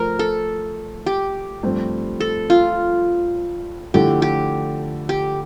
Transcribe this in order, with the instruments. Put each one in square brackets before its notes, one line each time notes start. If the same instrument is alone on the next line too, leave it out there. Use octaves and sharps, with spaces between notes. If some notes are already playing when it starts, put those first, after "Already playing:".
Already playing: [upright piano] F3 A3 [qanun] A#4 C5
[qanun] A4
G4
[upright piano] G2 F3 A3 C4
[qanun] A4
F4
[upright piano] D3 F3 A3 E4 A4 [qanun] G4
[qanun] G4
G4